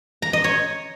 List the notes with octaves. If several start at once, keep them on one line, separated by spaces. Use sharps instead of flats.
A#5
D#5
C#5